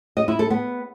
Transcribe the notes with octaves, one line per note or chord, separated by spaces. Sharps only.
D#5
E4
A4
B3